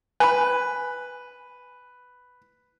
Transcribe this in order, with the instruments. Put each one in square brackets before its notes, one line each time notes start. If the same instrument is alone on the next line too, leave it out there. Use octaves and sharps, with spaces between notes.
[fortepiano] B4 [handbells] G#5 B5